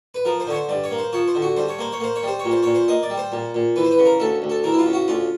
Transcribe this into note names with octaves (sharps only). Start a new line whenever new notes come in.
B4
F3 A#4
C5
D3 C#5
C5
G2 D5
C#5
A#3
C5
F3 C#5
C5
D3
F#4
G2 C5
C#5
A#3 C5
C#5
A#3 C5
C#5
G3 C5
C#5
A#2
C5
A#2 C#5
C5
A#3 D#5
D5
G3
C5
A#2
A#2
E3 B4
C5
B4
C#3
A#4
D2 A4
D2
A4
E3 A#4
E4
F4
C#3
F#4
D2 F4